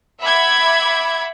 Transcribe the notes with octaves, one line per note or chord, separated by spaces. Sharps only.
E5 F#5 B5 D6 G#6